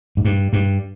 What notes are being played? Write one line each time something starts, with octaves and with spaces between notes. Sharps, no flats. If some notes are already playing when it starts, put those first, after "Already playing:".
G#2
G2
G2